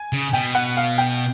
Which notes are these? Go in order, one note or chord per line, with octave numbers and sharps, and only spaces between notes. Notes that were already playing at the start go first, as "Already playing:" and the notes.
Already playing: G#5
C#3
B2 G5
F#5
F5
G5